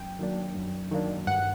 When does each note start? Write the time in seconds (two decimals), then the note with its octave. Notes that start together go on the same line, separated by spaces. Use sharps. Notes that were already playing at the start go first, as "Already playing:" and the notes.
Already playing: F#2 G5
0.19 D#3 F#3 A#3 D4
0.55 F#2
0.91 D#3 F#3 A#3 D4
1.27 G2 F#5